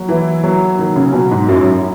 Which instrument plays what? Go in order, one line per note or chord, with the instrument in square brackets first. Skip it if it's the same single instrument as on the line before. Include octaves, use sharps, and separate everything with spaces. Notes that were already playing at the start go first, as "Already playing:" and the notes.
Already playing: [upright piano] F#3 A#3
[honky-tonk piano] E3 [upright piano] E4
[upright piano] F#3
[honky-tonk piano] D#3 [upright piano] A#3
[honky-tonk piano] C#3
[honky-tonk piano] B2 [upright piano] F#3
[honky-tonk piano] G#2
[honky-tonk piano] F#2 [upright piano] E4
[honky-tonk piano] G#2
F#2